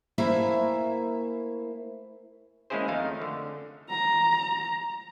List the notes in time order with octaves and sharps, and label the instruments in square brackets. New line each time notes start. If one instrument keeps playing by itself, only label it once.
[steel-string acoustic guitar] A3 A#3 E4 C5 E5 G#5
[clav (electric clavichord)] G#3 A#3 C#4 E4 G#4 C5
F2 D#3 A3 D#4 F5
D3
[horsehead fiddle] A#5